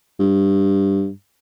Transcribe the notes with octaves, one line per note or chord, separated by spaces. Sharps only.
G2